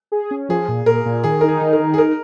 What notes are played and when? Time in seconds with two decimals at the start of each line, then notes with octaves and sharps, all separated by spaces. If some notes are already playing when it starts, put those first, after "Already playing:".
0.12 G#4
0.31 C#4
0.49 F3 G#4
0.68 A#2
0.86 A#2 A#4
1.06 A#2
1.24 D#3 G#4
1.41 D#4 A#4
1.49 G#4
1.61 D#3
1.73 A#4
1.80 D#4
1.94 G#4
1.98 A#4